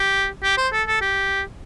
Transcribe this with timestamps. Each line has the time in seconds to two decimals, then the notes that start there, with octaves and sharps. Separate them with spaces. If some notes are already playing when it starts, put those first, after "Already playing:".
Already playing: G4
0.43 G4
0.58 C5
0.73 A4
0.87 A4
1.01 G4